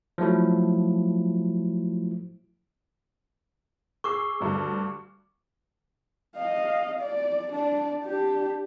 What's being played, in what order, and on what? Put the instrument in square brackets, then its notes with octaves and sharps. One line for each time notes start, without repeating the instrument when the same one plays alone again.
[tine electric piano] F3 F#3 A3 E4
[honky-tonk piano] G#4 E6 C7 [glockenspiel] C#6 D6
[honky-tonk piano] D2 G2 D3
[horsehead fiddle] D#5 F5
D5
D4 D5
D4 G4